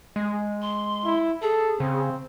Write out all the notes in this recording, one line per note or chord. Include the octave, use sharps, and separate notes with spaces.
G#3
C6
E4
G#4 A4
C#3 C4